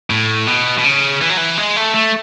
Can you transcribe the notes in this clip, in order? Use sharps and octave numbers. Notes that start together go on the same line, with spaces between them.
A2
B2
B2
C#3
E3
F#3
E3
G#3
A3
A3